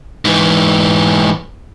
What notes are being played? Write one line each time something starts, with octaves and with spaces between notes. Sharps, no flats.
G#2 E3